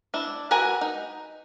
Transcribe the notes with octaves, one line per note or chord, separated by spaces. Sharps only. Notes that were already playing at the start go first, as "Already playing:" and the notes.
D4 E4
F#4 A#4 B4 F#5 G#5
D#4